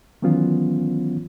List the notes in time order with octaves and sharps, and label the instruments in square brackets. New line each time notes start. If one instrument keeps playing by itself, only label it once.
[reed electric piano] D#3 E3 F#3 B3 C#4 F4